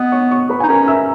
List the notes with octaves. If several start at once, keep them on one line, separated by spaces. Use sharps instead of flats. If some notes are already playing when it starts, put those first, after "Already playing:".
Already playing: B3 D#5 D#6
C#5 C#6
C#5 C#6
B4 B5
D#4 G#5
C#4 A#4 A#5
E5 E6